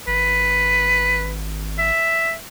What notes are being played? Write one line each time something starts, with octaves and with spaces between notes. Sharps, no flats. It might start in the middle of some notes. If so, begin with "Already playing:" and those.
G#1 B4
E5